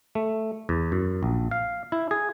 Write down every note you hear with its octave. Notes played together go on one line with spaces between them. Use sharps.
A3
E2
F#2
A#1
F5
E4
G#4